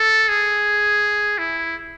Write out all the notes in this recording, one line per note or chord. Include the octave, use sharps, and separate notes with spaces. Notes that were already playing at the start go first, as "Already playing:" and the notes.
Already playing: A4
G#4
E4